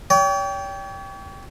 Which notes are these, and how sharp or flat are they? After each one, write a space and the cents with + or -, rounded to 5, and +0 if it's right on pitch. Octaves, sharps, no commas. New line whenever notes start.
C#5 +45 G5 +0